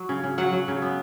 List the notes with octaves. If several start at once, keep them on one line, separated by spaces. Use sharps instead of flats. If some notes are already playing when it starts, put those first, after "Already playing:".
Already playing: F#3
C#3
C#3
F#3 F#5
F#3
C#3
B3